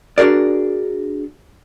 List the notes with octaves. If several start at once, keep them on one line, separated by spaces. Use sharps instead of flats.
D4 F#4 G#4 A#4 D5